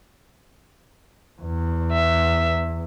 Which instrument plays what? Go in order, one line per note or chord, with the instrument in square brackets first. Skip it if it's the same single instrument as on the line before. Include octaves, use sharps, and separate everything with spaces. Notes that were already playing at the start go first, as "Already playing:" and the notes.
[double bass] E2
[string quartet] E5